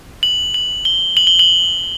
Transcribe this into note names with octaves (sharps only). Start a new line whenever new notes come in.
F#7
F#7
G7
F#7
G7
F#7